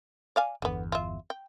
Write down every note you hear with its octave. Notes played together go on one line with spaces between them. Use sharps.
D5 F5 G#5
G1 E2 D3 B3
F4 E5
G5